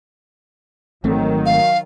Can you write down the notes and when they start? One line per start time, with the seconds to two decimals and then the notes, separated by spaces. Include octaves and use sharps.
1.04 G#1 D#3 F#3 A3 C4
1.46 F5